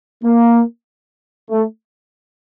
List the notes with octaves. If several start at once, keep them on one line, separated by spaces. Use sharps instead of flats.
A#3
A3